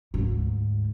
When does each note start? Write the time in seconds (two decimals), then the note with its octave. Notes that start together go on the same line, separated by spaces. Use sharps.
0.14 D2 G#2